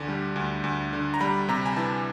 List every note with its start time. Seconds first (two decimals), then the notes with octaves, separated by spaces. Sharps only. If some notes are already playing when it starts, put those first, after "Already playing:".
Already playing: D2 D3 A5
0.08 G3
0.36 D2
0.64 D2
0.93 D3
1.14 A#5
1.20 G3 B5
1.49 C3 A#5
1.66 G#5
1.77 E3 A5